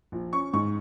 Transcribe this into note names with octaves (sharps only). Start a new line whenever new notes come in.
A#1
C#4 C#6
G#2 C#6